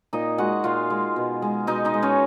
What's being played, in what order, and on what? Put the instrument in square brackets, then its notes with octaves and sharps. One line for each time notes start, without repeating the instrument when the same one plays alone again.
[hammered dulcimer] A#2 D#4 D#5
G#3 F#4 F#5
A#2 F4 F5
G#3
B2
G#3
B2 D#4 D#5
D#4 D#5
G#3
C#4 C#5